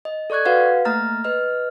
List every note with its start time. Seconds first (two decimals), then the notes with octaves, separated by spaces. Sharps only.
0.05 D#5
0.30 A4 D5 C#6 F#6 G#6
0.45 F#4 B4 F5 F#5
0.85 A3 A#3 A#5 F6 A6
1.24 B4 D#5 F6